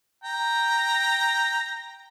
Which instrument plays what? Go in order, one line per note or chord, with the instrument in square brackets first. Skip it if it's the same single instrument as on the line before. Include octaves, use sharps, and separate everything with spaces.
[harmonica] G5 A#5